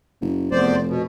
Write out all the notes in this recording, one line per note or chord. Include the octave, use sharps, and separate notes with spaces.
F#1
F1 E2 C5 D5
B2